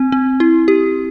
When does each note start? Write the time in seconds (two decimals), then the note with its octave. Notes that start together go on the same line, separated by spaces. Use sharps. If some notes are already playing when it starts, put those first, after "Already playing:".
Already playing: C4
0.12 C4
0.40 E4
0.68 G4